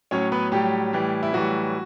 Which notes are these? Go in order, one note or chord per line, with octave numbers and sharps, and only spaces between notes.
A2 F#3 C#4 C#5
B3 B4
A2 F#3 G3 G4
A2 E3 G3
E4
A2 E3 F#3 G3 F#4